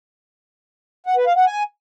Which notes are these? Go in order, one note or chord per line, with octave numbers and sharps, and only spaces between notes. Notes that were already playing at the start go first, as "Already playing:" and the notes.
F#5
B4
F5
F#5
G#5